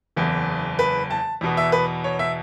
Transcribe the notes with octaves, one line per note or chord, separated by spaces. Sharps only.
F#1 E2 E3
B4
A5
E2 B2 B3
E5
B4
C#5
E5